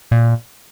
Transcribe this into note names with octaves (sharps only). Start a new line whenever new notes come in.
A#2